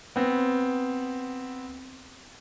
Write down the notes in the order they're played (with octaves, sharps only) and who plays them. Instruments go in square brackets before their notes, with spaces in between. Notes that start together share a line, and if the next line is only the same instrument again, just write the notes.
[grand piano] B3 C4